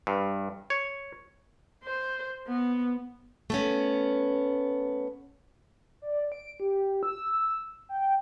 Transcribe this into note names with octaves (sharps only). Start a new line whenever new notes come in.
G2
C#5
C5
B3
A3 B3 C#4
D5
D7
G4
E6
G5